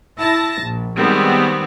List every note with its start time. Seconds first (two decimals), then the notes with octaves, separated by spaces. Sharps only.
0.19 E4 A5 A#6
0.62 A#1
0.97 D#3 G3 G#3 B3 C4